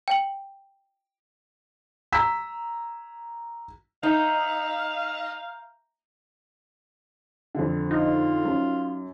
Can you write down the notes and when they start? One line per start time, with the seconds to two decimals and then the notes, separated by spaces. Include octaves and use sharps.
0.08 G5 F#7
2.12 A#5 E6 B6
4.03 D#4 E5 F5 A#5 G6
7.55 F2 D3
7.91 D#4 F4
8.45 F#2